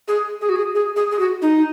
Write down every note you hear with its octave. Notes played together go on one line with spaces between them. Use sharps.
G#4
G#4
F#4
G#4
G#4
G#4
G#4
F#4
D#4